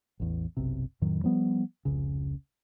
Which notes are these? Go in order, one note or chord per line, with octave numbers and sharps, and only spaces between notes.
A1 E2
F#1 B1 C3
F2 A2 D#3 F#3
F3 G3 B3
F1 C#2 C#3